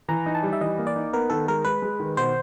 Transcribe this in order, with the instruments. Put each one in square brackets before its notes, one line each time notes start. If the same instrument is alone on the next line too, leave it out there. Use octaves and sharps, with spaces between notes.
[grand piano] E3 [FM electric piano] A#5
[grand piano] D#4
[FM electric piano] A5
[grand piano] G3
[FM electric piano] E5
[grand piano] E3 [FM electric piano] D#5
[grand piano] A#3
[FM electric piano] D5
[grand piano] D#4
[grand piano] B3 [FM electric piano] A#4
[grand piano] D#3 [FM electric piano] A4
[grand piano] G#3 [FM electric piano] A#4
[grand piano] G#3 [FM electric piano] B4
[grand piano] G#3
D#3
[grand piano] B2 [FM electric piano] C5